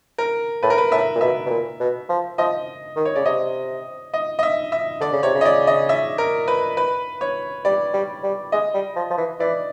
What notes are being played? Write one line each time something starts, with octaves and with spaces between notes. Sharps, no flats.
A#4
A2 B4
A#4
B4
A2 E5
A#2
B2 E5
B2
A#2
B2
F3
F3 D#5
D#3
C#5
C#3 D5
C3 D#5
D#5
D#5
E5
E5
D3 D5
C#3
C3 C#5
C#3
D#5
D5
D#5
E5
A#4
B4
B4
C#5
G3 D5
G3
G3
G#3 D#5
G3
F3
F3
E3
E3 D5